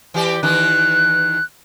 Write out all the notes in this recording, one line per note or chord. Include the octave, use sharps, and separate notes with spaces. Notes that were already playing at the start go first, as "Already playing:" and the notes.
E3 G4 D5
D#3 E3 D#4 F#6